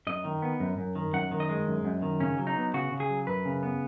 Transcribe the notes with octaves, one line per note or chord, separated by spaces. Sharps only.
F#2 D#5
D#3
B3
F#2
F#2
D#3
F#2 F#5
D#3
D#5
G#3
F#2
F#2
D#3
C#3 C#4
F#3
D#4
B3
C#3 F#4
C#3
G#4
F#3
F#2 B4
C#3
B3